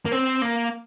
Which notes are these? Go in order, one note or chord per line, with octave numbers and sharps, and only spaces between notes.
A#3
C4
A#3